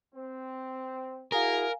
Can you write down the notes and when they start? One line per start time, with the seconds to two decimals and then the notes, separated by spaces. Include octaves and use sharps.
0.15 C4
1.32 E4 F#4 G#4 A#4 F5 G#5